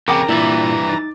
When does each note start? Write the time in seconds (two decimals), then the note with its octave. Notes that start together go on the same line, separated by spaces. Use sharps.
0.08 F2 C#3 A#4 G5 A#5 D6
0.29 G2 A#2 E3 E4 E5 A6
0.89 D#4 A6